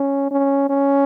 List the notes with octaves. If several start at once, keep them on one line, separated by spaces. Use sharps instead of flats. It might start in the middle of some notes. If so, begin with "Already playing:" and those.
Already playing: C#4
C#4
C#4